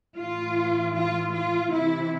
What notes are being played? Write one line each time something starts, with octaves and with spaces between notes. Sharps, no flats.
A2 E3 F4
F4
F4
C3 E3 E4